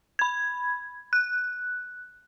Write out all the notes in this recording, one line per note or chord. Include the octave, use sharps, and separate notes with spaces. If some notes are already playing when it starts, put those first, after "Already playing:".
B5 G#6
F#6